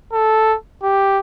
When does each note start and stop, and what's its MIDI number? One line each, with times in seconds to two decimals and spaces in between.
0.13 0.55 69
0.83 1.19 67